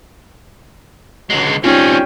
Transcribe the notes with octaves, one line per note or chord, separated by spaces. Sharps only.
C#2 D3 F#3 G#3
F#1 G3 C4 C#4 D#4 F4 G#4 G5